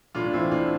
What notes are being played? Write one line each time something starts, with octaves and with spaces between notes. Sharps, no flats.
A2 D4 F4
E3 C4 E4
A2 D4 F4